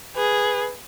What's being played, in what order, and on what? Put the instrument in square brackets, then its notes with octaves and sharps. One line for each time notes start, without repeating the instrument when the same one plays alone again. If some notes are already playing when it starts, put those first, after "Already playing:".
[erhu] G#4 [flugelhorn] B4